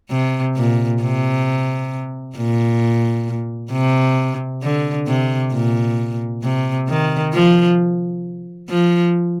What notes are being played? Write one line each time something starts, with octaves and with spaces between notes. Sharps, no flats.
C3
A#2
C3
A#2
C3
D3
C3
A#2
C3
D#3
F3
F3